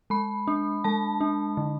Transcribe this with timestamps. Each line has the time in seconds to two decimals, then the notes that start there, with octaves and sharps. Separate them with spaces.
0.10 G#3 B5
0.47 D4
0.84 G#3 A5
1.21 D4
1.57 D3